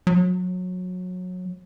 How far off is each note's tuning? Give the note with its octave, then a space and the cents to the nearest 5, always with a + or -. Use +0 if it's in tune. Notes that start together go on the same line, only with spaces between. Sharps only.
F#3 -25